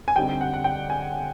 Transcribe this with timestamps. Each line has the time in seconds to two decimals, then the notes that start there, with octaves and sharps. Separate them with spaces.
0.08 G#5
0.16 D3 G3 C4 D#4 G5
0.41 F#5
0.54 F#5
0.64 G5
0.90 G#5